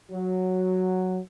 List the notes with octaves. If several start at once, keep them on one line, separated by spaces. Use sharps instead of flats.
F#3